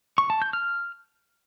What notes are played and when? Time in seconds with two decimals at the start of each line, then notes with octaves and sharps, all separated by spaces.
0.18 C#6
0.30 A5
0.42 G6
0.53 F6